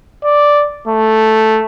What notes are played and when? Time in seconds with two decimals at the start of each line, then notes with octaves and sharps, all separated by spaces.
0.24 D5
0.88 A3